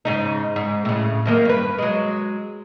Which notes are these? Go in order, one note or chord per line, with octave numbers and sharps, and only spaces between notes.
G#2 C#3 D#4
G#2
A2 C#3
F#2 D#3 A#3
G2 B4
F#3 G#3